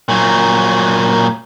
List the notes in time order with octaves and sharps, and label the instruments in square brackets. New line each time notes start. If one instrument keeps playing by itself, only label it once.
[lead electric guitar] A#2 F#3